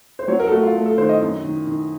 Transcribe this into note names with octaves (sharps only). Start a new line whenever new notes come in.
C5
F#3 C#5
A#4
A4
A3 F#4
F4
A3
A4
D#3 C5
D#5
F#2
D#3
D#3